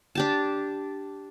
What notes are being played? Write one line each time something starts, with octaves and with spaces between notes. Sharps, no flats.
D4 G4 A5